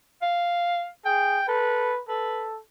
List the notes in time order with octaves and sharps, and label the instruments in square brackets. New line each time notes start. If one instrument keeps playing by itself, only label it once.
[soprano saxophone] F5
[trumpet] G#4 [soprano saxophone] G5
[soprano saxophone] A4 [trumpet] B4
[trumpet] A4 [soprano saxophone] B4